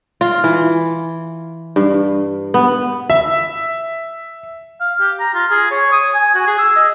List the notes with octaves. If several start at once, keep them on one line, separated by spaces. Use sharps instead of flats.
F4
E3
G2
B3
E5
F5
G4
A#5
F4
G#4
C#5
D#6
G#5
F#4
G#4
E6
D#5